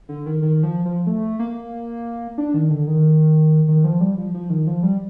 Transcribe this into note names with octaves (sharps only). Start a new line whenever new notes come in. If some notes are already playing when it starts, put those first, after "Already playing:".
D3
D#3
D#3
F3
F3
A3
A#3
D4
D#3
D3
D#3
D#3
F3
G3
F3
F3
D#3
F3
G3